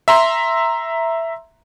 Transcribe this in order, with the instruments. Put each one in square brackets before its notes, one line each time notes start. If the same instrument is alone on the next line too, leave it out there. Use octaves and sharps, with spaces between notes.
[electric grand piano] E5 A#5 C6